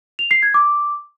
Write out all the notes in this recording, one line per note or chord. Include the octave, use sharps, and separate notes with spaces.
F7
C7
G#6
D6